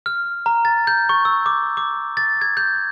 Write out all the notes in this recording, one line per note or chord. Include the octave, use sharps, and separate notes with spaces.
F6
A#5
A6
G6
C#6
E6
D6
D6
A6
G#6
G6